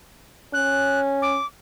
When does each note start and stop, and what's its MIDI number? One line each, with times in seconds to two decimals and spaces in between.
0.54 1.37 61
0.54 1.00 90
1.22 1.46 86